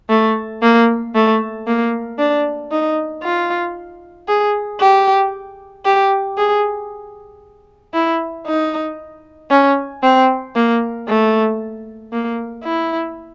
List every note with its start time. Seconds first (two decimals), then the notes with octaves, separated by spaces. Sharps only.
0.09 A3
0.62 A#3
1.14 A3
1.67 A#3
2.19 D4
2.71 D#4
3.23 F4
4.28 G#4
4.81 G4
5.85 G4
6.37 G#4
7.94 E4
8.47 D#4
9.51 C#4
10.03 C4
10.56 A#3
11.08 A3
12.13 A#3
12.64 E4